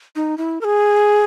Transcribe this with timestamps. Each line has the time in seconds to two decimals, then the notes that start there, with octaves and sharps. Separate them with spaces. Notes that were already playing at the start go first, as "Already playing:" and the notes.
0.16 D#4
0.38 E4
0.61 A#4
0.64 G#4